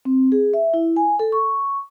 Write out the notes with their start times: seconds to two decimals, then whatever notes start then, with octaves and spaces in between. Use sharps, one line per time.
0.05 C4
0.32 G#4
0.54 E5
0.74 E4
0.96 G#5
1.19 A4
1.32 C#6